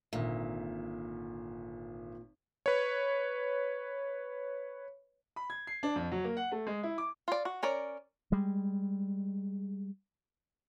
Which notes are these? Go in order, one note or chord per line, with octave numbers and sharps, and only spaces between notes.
G#1 A#2 D3 E5
B4 C#5
B5
G#6
C7
D4
F2
F#3
A#3
F#5
A3
G#3
E4
D6
F4 D5
F#4
C#4 A#4 D5
G3 G#3